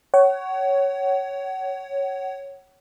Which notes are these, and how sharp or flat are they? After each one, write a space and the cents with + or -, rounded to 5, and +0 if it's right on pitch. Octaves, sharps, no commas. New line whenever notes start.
C#5 +0 F#5 +35